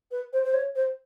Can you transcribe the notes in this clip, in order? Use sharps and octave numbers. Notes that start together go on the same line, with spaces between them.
B4
C5
C5
C#5
C5